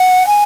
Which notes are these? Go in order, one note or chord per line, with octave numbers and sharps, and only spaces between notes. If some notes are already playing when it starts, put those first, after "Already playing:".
Already playing: F#5
G#5